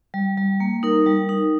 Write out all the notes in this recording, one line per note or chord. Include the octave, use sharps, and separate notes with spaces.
G3
G3
A#3
D#4 A#4
G3
D#4